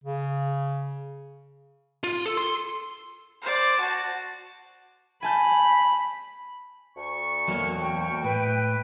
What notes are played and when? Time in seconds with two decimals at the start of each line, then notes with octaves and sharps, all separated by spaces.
0.04 C#3
2.04 F4
2.25 A4
2.37 C6
3.42 C5 D5
3.80 F#4 A5
5.23 G#5 A5 B5 G6
6.96 D2 C#6
7.48 E2 F#3 A#3
7.81 G5
8.24 A2 B4